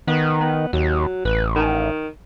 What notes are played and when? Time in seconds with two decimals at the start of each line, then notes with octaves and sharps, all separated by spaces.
0.07 D#3 B3
0.41 B3
0.73 D#2 F#3
1.25 A1 B4
1.56 D#3